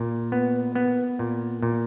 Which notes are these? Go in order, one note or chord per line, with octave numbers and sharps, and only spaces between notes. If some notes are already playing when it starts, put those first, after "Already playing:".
Already playing: A#2
B3
B3
A#2
A#2